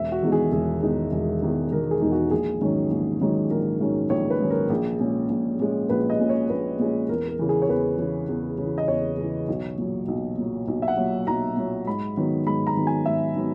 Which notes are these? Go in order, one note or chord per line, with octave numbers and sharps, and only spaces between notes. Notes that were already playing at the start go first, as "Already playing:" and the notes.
Already playing: E1 E5
F#4
E2 D#3 G#3 D#4
G#4
E1 G#4
E2 D#3 G#3 D#4
E1
E2 D#3 G#3 D#4
E1 A#4
G#4
E2 D#3 G#3 D#4
F#4
A#1 G#4
G#2 D#3 F#3 C#4
A#1
G#2 D#3 F#3 C#4
A#1 A#4
G#2 D#3 F#3 C#4
A#1 C#5
B4
G#2 D#3 F#3 C#4
A#4
A#1 G#4
A#2 G#3 C#4
A#1
A#2 G#3 C#4
A#1 B4
D#5
A#2 G#3 C#4
C#5
A#1 B4
A#2 G#3 C#4
E2 A#4
A#4
C#3 E3
G#4
C#5
E2 B4
C#3 E3
E2
C#3
E3
D#5
E2 C#5
C#3 E3
B1
A#2 F#3
B1
A#2 F#3
B1
E5
F#5
A#2 F#3
B1 A#5
A#2 F#3
G#2 B5
D#3 F#3 B3
G#2 B5
A#5
D#3 F#3 B3
G#5
G#2 E5
D#3 F#3 B3